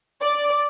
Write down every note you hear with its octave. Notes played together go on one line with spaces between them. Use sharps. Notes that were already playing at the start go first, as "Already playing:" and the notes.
D5